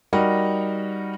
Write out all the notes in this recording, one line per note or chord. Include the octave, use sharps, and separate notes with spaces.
G3 D#4 F#4 A#4 D#5